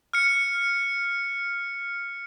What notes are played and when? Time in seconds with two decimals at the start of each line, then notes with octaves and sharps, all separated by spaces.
0.13 F6 C#7